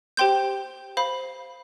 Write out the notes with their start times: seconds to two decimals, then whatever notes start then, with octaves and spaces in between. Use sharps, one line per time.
0.17 G4 C5 G5 C6 G6
0.97 C5 F5 B5